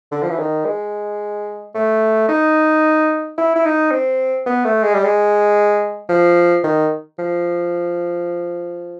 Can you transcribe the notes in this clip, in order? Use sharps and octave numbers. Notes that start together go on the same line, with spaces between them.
D3
F3
E3
D#3
G#3
A3
D#4
E4
E4
D#4
C4
B3
A3
G#3
G3
G#3
F3
D#3
F3